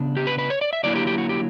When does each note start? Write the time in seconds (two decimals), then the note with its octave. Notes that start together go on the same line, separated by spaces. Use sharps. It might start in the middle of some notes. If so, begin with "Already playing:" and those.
Already playing: C#3 B3 D4
0.17 G4
0.27 B4
0.38 B4
0.50 C#5
0.61 D5
0.73 E5
0.83 D3 F#3 A#3 E4 D5
0.96 G4
1.07 G4
1.18 F#4
1.29 G4